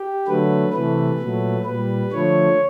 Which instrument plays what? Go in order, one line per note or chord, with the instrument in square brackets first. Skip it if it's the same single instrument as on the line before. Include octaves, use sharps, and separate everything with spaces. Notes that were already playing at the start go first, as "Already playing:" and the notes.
Already playing: [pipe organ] G4
D3 F#3 A3 B4
C3 E3 A3 B4
A#2 F#3 A3
A#2 G3 B4
D3 F3 A3 C#5